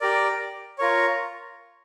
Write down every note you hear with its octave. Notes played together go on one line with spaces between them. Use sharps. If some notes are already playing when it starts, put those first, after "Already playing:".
G4 A#4 D5
F4 A#4 C#5